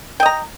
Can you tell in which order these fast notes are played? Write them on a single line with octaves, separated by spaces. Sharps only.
G5 D#5 A#5